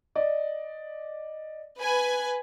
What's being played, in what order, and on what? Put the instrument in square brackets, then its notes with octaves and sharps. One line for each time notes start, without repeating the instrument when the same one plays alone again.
[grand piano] D5 D#5
[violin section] B4 G#5